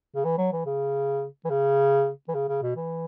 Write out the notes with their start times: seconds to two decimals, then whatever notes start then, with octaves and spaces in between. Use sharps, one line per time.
0.15 C#3
0.24 E3
0.38 F#3
0.53 E3
0.66 C#3
1.45 E3
1.50 C#3
2.29 E3
2.35 C#3
2.49 C#3
2.62 B2
2.76 E3